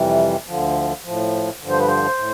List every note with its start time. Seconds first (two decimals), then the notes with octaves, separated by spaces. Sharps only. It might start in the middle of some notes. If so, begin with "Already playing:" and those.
Already playing: F2 C3 E3 G3
0.48 D2 D3 F3
1.05 A2 F3
1.61 G2 D3 F3
1.70 C5
1.79 B4
1.88 C5
2.18 A2